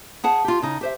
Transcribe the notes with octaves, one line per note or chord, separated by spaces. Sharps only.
G#4 F#5 A5
F4 G4
C#3 D#4
G4 C5 E5